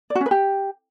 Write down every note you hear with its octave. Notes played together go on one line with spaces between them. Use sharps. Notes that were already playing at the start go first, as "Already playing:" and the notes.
D5
F#4
C#4
B4
G4